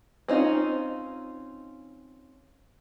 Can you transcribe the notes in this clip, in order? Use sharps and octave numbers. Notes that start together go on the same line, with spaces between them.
C4 C#4 D#4 F4